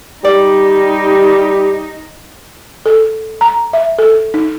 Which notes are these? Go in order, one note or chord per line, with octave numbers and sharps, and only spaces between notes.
G3 D#4 G4 D5
A4
A#5
E5
A4
D#4